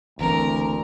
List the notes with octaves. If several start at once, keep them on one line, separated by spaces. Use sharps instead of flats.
F#1 D2 E3 C4 A#4